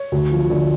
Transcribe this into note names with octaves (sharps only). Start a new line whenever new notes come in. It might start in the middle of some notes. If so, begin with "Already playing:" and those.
Already playing: C#5
D2
F3
D3